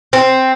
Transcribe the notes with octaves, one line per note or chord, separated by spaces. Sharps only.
C4